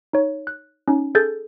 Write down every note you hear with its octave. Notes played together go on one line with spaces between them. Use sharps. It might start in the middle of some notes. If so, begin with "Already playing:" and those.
D#4 C#5
F#6
C#4 D#4
G#4 A4 G6 A6